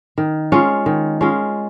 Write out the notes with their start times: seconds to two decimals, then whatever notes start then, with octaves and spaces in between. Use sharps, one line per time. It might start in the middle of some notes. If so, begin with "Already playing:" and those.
0.18 D#3
0.52 G#3 C#4 F4
0.86 D#3
1.21 G#3 C#4 F4